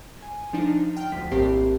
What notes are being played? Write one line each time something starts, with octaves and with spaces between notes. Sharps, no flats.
G#5
F3 D4 D#4
G5 F6
D2 F3 B6
A#1 A2 C4 G4 C7